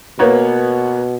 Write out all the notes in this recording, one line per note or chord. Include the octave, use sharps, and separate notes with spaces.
B2 A#3 B3 C#5